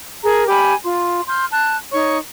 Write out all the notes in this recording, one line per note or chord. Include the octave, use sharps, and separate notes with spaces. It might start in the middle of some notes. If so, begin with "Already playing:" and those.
G#4 A#4 A#5
G4 G#5 B5
F4 C6
C6 F6 G6
A5 F#6
D#4 C#5 C#6